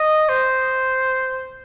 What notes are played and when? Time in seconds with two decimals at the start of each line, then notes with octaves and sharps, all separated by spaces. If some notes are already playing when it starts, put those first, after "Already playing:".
Already playing: D#5
0.29 C5